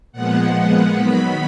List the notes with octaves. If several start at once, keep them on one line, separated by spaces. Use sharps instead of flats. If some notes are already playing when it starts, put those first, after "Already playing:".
A#2 F3 G#3 B3 F#5
D#3 F#3 B3 B5